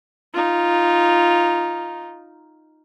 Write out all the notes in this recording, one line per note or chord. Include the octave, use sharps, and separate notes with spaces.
D#4 F4